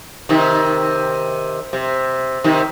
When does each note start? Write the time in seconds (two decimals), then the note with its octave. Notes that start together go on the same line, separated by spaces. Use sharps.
0.29 C3 D#3
1.73 C3
2.44 C3 D#3